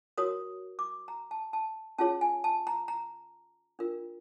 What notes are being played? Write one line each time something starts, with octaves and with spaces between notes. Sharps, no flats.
F#4 A#4 C#5 D#6
D6
A#5
A5
A5
C#4 F4 G#4 C#5 A5
G#5
A5
A#5
A#5
D4 F4 A#4